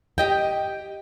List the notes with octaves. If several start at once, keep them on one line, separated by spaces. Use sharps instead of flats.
G4 D#5 G5